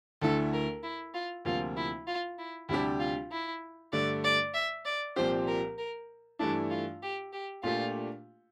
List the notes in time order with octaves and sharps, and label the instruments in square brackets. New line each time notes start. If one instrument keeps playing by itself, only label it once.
[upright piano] D2 D3 A3 E4 [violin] A4
[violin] A#4
E4
F4
[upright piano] D2 C3 F3 A#3 [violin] F4
[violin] E4
F4
E4
[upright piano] D2 C3 G3 D4 G4 [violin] E4
[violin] F4
E4
[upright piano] G2 D3 A3 [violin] D5
[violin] D5
E5
D5
[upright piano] C2 A#2 F3 C4 G4 [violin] C5
[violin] A#4
A#4
[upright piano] G2 E3 A3 E4 [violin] D4
[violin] F4
G4
G4
[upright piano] A#2 A3 D4 G4 [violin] F4